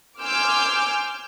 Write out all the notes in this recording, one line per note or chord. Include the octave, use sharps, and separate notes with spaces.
G#5 C6 D6 E6 F6 G6